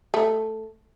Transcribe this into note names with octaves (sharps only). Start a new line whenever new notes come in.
A3